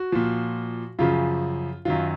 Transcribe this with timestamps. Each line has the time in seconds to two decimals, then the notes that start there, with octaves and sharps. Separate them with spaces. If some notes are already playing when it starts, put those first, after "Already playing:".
Already playing: F#4
0.12 A#2 F3
0.99 F#2 C#3 F3 F4
1.85 F#2 D#3 F#3 F4